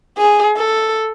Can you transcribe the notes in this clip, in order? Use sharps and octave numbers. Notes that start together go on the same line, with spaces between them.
G#4
A4